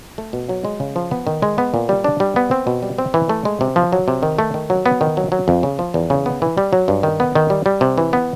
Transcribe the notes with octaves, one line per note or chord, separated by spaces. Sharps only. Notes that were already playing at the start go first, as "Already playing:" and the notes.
A3
B2
F#3
G#3
C#3
F3
B3
D#3
G#3
B3
A#2
G3
D4
G3
B3
C4
B2
G3
C4
E3
A3
G#3
C3
F3
F#3
C3
D#3
A3
D#3
F#3
B3
D#3
F#3
F#3
F2
C#3
F3
E2
C#3
B3
E3
G3
F#3
G2
D#3
B3
D#3
G3
G3
C3
E3
B3